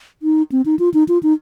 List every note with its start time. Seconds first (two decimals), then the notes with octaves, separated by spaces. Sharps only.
0.23 D#4
0.52 C4
0.66 D#4
0.79 F4
0.94 D#4
1.08 F4
1.23 D#4